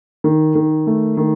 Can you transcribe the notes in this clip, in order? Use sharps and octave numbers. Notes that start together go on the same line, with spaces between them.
D#3
D#3
A3
D#3